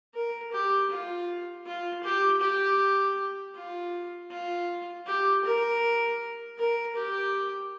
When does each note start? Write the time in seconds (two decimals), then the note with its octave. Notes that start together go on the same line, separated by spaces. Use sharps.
0.14 A#4
0.52 G4
0.90 F4
1.66 F4
2.03 G4
2.41 G4
3.55 F4
4.31 F4
5.06 G4
5.44 A#4
6.58 A#4
6.96 G4